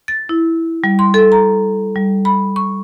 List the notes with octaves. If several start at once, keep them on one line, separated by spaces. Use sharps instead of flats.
A6
E4
G3
C6
A4
A#5
G3
B5
C#6